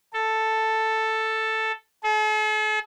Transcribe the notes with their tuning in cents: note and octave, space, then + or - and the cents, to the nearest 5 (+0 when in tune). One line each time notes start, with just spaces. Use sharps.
A4 +5
A4 -45